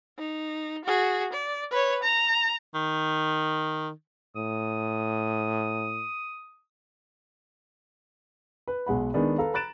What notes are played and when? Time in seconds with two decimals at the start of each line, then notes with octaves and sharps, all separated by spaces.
0.18 D#4
0.85 F#4 G#4
1.33 D5
1.71 B4 C#5
2.03 A#5
2.74 D#3
4.36 A2 D#6
8.68 B4
8.86 B1 G#3 F#5 B5
9.14 D#3 G#3 B3 D4
9.38 A4 B4 F5 A#5
9.54 A#5 B5 F#6 A6 D7 E7